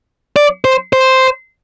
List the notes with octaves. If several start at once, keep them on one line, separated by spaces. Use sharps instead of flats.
D5
C5
C5